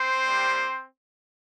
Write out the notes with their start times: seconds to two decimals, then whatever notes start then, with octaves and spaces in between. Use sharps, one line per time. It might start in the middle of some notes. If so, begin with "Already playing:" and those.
Already playing: C4 C5
0.27 G3 A#3 G4